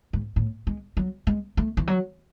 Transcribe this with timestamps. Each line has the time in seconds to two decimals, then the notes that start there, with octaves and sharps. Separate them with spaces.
0.13 G#2
0.36 A2
0.67 G#3
0.97 F#3
1.27 G#3
1.57 A3
1.77 E3
1.87 F#3